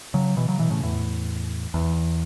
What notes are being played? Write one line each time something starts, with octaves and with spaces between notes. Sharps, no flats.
C#3 F#3
B2 E3
C#3 F#3
B2 E3
A2 C#3
E2 A2
E2